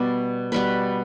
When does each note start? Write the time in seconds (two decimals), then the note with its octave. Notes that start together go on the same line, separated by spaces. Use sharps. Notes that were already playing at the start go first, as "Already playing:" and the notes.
Already playing: B2 G3 B3 D5
0.52 B2 G3 B3 B4